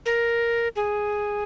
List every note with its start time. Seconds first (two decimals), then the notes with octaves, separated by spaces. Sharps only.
0.06 A#4
0.76 G#4